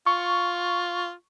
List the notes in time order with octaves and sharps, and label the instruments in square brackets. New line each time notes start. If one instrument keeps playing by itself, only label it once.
[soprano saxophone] F4 [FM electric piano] C#6